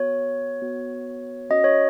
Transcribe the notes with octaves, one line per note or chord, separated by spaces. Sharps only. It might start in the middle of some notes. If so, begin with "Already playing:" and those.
Already playing: B3 F#4 C#5
B3 F#4
C#4 F#4 D#5
C#5